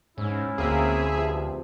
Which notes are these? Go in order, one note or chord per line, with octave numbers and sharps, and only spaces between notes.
G#2 C#4 E4
D2 G#3 A#3 C4 G#4 E5
G2 C3 F3